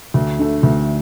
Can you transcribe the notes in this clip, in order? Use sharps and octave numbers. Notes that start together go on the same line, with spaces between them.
D2
D3 A3
D2